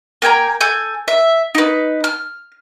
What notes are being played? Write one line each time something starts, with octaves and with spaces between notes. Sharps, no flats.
A#3 G5 G#5 A#5
A4 G#5 G6
E5
D#4 B4
F6